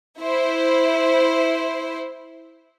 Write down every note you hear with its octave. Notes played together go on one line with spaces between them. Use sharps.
E4 C5